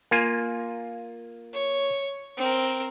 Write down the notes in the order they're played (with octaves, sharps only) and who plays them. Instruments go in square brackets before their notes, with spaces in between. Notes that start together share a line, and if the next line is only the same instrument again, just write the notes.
[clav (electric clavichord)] A#3 F4 G#5
[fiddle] C#5
C4 A#4